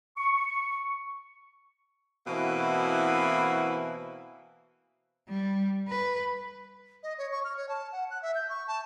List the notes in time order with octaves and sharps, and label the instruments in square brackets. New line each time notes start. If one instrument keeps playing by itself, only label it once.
[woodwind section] C#6
[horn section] B2 E3 A#3 C4 E4 F#4
[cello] G3
B4
[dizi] D#5
C#5
C#6
F6
C#5
A5
F#5
F#6
E5
G6
C#6
A5